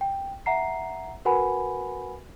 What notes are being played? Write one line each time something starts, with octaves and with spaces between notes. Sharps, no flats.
G5
E5 F#5 A#5 C7
F#4 A#4 B4 F#5 G#5 B5